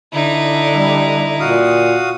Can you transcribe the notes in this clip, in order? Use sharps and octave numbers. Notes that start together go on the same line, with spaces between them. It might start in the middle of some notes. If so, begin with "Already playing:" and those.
D3 D#4 E4
G3
A#2 F#4 F5 D#6